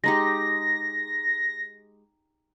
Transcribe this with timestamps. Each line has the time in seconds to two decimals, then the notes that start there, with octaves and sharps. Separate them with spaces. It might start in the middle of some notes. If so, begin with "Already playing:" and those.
0.04 G#3 D#4 G4 A#6